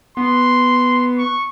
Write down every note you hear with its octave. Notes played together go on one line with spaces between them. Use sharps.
B3 C6
C#6